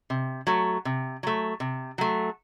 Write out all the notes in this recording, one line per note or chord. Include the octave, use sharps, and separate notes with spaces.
C3
F#3 A3
C3
F#3 A3
C3
F#3 A3